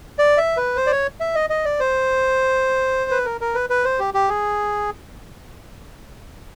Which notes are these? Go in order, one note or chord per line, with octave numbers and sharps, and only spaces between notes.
D5
E5
B4
C5
D5
C#5
E5
D#5
D#5
D5
C5
B4
A#4
A#4
B4
B4
C5
G4
G4
G#4